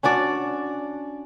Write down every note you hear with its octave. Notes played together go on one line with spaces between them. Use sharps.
C#4 D4 F#4 D5